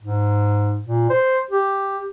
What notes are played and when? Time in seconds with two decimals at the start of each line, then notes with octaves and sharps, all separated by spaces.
0.03 G#2
0.84 A#2
1.10 C5
1.51 G4